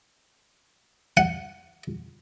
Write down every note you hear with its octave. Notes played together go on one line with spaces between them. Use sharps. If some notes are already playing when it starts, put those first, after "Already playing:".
F#5